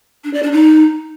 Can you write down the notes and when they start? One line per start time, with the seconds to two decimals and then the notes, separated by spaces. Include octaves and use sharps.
0.24 D4
0.33 D5
0.43 D4
0.52 D#4